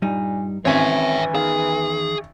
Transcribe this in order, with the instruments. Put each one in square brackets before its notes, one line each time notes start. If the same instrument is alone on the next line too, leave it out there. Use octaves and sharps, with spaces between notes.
[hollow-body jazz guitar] G2 G3 D#4 [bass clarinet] A#2
[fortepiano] G#1 C#4 G#5 [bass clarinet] E3 [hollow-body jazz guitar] C4 [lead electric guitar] C#5 E5
[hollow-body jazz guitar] E2 D#3 F5 [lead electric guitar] G#4